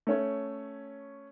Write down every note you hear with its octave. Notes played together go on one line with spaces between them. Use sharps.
A3 C#4 C#5